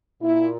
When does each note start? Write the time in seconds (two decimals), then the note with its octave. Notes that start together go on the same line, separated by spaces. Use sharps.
0.21 A#2 E4